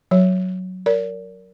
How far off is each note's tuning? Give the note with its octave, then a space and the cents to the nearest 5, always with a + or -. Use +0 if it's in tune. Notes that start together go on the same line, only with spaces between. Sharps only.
F#3 +0 C#5 +0
A#4 -5 D5 -40